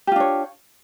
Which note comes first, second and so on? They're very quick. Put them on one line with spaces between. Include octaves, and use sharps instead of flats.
G4 F4 D4 C#5